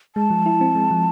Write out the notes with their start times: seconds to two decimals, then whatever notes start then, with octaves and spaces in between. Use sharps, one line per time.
0.16 G#3 A5
0.30 F3
0.46 E4
0.61 C4
0.75 G#3
0.91 F3